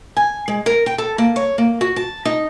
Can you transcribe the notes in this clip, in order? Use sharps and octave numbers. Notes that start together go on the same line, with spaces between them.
G#5
G#3
A#4
G5
A4
A#3
C#5
A#3
F#4
A5
D#4